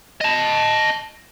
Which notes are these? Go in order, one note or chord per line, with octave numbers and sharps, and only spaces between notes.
D#5 A5